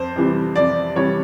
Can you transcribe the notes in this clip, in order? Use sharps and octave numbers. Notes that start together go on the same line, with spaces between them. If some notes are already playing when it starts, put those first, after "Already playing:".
Already playing: F2 C5
C3 E3 G3
F2 D5
C3 E3 G3 C#5